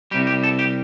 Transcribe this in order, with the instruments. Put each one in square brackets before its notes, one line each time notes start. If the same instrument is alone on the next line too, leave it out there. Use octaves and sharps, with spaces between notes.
[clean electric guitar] C2 C3 G3 G4
G4
A4
G4